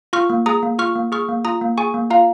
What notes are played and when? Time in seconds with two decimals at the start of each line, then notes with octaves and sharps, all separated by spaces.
0.13 F4 C#6 F6
0.30 A#3
0.46 G#4 A#5 D#6
0.63 A#3
0.79 F4 C#6 F6
0.96 A#3
1.12 G#4 C#6 F6
1.28 A#3
1.45 F4 A#5 D#6
1.62 A#3
1.78 G#4 G#5 C#6
1.94 A#3
2.10 F4 F5 A#5